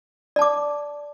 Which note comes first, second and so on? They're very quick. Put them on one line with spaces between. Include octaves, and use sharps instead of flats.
D5 A5 D6